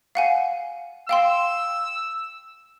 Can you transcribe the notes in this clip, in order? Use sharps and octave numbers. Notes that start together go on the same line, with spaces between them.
F5 F#5 G#5
F5 G5 C6 E6